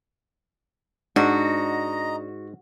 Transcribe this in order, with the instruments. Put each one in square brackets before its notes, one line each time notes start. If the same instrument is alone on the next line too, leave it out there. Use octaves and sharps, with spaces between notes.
[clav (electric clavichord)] G#2 [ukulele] D4 [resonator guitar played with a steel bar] F#4 [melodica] D#5 A#5